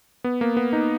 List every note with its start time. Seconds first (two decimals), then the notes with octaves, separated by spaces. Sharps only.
0.24 B3
0.41 A#3
0.57 B3
0.73 D#4